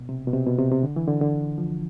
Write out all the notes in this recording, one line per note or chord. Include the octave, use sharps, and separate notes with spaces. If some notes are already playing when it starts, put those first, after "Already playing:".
Already playing: B2
C3
B2
C3
B2
C3
C3
D3
E3
D3
D3
F3